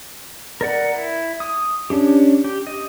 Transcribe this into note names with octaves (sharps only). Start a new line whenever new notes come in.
A#4 D5 F#5
E4
D#6
C#4 D4 G4
G4
D#5